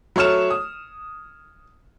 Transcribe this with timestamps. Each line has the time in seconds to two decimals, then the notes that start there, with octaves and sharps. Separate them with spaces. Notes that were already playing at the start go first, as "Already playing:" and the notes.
0.16 F#3 A3 C#5 F6 E7
0.50 D#6